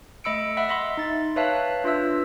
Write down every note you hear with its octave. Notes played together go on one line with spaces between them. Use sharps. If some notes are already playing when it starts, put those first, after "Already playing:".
A3 D#5 B5 E6 C#7 D7
E5 F#5 B5 E6
D#5 E5 B5 C6
D#4 A6
B4 C#5 E5 F5 A5 F#6
D4 F4 B4 E5 E6